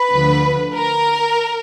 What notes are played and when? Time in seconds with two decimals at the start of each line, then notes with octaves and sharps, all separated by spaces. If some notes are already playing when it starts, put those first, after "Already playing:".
Already playing: B4
0.12 D2 D3 F3
0.75 A#4